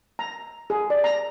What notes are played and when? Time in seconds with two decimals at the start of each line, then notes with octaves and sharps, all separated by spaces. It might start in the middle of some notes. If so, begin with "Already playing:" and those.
0.19 A#5
0.70 G#4
0.90 D5
1.04 A#5